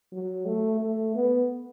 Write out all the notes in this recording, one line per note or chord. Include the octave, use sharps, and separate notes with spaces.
F#3
A3
A3
B3